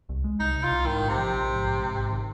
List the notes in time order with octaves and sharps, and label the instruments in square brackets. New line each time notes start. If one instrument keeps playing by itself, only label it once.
[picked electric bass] C2
G#3
[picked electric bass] C2 [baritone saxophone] D#4
[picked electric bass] C3
[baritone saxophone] F4
[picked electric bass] C2
[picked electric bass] G#2 [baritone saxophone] D#3
[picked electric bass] A#1
[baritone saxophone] C3
[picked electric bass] F3
A#1
G#2
A#1
G#2
G#1
D#3